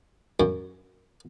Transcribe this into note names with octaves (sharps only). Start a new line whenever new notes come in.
F#2